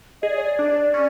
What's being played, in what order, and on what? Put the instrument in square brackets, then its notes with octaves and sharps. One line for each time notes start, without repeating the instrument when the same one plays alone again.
[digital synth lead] G#4 [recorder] D#5
[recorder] D5
C#5
D5
[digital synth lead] D4
C#4